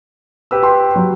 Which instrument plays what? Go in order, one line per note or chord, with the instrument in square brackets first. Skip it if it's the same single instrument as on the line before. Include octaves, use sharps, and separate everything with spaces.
[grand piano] G4 B4 E6
[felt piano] G5 C6
F#3